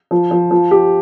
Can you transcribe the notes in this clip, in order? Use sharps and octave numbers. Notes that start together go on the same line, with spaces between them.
F3
F3
F3
G4